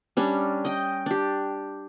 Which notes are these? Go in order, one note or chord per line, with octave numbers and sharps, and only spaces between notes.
G3 C#4 D4
D#5 G5
D4 G4